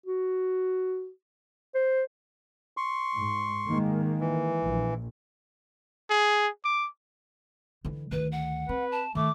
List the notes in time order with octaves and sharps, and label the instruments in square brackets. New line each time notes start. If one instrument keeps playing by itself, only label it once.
[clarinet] F#4
C5
[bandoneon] C6 C#6
[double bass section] G#2
D#3 G#3 A#3
[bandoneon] E3
[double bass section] A#1
[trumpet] G#4
D6
[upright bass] D3 E3
[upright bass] D2 D#3 [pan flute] B4
[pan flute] F#5
[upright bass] C4 [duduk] B4
[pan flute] A5
[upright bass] D#3 [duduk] A3 [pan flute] D6